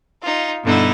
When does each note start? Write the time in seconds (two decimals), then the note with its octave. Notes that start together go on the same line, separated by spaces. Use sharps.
0.22 D#4 F4
0.63 G2 B2 D3 D#4 E4